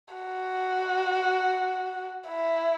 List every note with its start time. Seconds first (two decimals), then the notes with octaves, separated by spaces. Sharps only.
0.14 F#4
2.28 E4